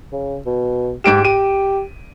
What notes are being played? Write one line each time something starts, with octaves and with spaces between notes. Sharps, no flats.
C#3
B2
G#2 G4 D7 E7
G4 D#7